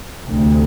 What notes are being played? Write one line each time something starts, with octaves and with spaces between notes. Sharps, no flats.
D2 C3